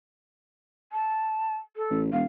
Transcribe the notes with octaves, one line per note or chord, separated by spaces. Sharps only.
A5
A4
A1
E1 F5